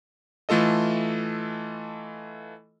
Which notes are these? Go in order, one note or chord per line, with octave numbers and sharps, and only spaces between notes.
E3 A3 F4 A4 D#5